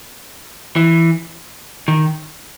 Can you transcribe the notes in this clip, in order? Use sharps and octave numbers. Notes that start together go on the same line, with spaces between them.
E3
D#3